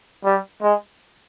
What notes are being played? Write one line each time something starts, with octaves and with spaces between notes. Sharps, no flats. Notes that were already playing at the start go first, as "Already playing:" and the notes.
G3
G#3